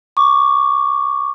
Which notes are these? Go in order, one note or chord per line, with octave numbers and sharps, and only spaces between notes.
C#6 D6